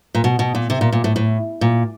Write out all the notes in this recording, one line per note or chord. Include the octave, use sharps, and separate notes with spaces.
A#2
B2
B2
A#2
C3
A#2
A#2
A2
A2
A#2